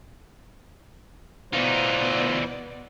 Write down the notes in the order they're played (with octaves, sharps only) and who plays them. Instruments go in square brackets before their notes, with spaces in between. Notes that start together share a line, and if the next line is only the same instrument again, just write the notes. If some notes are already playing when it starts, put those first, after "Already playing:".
[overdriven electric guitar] D2 F4 [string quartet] B2 B3 D5 [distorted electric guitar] E3 D#4 [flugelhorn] C5